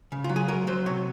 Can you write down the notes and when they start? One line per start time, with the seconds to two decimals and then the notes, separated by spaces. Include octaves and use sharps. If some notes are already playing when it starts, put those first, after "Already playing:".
0.12 C#3
0.24 F4
0.29 F#3
0.36 G#4
0.48 F#3 A#4
0.67 F#3 C5
0.86 C3 C#5